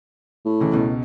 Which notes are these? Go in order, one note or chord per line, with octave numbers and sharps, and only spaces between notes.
A2
C#2 E3
C#2 B2